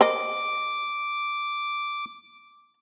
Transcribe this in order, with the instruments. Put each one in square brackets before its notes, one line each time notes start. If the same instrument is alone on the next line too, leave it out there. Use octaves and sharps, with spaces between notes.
[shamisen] A#4 C5 D#5 [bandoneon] D6